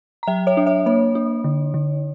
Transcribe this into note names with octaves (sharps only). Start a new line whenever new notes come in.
A#5
F#3 E5 G5
C#5 E5
D4
C#5 E5
A#3 C#5
D4
D3
D3